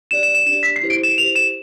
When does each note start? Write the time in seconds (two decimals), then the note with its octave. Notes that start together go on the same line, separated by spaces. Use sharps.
0.11 D4 G4 D5 E7
0.23 E7
0.35 E7
0.46 D4 G4 D5 E7
0.63 B6
0.76 C7
0.82 E4 G4 C5
0.90 D7
1.03 E7
1.18 E4 G4 C5 F7
1.36 E7